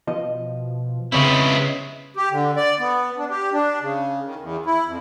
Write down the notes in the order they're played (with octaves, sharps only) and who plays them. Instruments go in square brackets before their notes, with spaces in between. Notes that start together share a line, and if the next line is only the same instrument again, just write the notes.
[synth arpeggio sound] B2 F3 [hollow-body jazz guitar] D#5
[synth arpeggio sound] C#3 C#5 B6 [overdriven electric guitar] G#3 E4 [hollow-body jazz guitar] B3 C4
[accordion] G4
D3
D5
B3
D4
G4
D4
C#3
D#3
E2
E4
F2